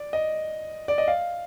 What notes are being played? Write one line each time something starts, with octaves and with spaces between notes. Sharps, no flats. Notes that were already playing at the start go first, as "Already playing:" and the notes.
Already playing: D5
D#5
D5
D#5
F5